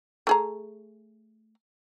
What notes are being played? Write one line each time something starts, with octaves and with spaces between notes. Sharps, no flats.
A3 G#4 A#5